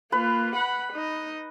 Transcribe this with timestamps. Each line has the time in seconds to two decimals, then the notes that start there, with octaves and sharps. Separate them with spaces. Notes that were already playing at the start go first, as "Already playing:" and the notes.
0.12 A#3 F4 B4
0.56 F#5 B5
0.93 D#4 D#5